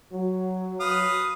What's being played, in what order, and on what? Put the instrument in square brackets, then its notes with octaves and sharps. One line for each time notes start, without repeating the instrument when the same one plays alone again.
[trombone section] F#3
[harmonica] B4 F5 D#6